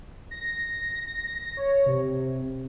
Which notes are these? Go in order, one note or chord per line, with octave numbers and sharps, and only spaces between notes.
A#6
C#5
C3